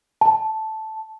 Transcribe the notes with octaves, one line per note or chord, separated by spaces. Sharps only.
A5